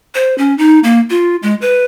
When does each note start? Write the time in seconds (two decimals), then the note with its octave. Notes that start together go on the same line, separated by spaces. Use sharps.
0.15 C5
0.38 C#4
0.58 D#4
0.84 A#3
1.10 F4
1.43 G#3
1.61 B4